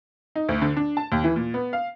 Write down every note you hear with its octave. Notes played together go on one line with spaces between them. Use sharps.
D#4
D2
D3
D4
A5
D#2
E3
A#2
B3
F5